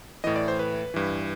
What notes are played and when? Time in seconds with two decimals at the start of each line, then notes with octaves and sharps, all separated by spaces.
0.24 A2 E3 D#5
0.36 D5
0.48 C5
0.59 B4
0.94 G2 E3